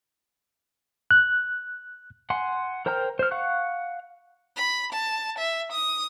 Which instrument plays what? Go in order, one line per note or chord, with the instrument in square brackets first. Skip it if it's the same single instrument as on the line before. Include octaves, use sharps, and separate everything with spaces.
[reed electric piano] F#6
[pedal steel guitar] F#5 G#5 C6
A#4 C5 G5 A#5 F6
C5 F6
F5 F#5 C#6 F#6
[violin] B5
A5
E5
D#6